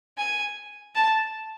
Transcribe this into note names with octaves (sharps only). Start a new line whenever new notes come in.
G#5
A5